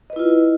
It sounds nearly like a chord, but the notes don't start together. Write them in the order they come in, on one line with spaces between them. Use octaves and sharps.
D#5 B4 E4 F4